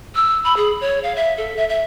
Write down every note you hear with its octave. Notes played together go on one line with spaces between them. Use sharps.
E6
B5
G#4
C#5
F5
E5
A4
E5
E5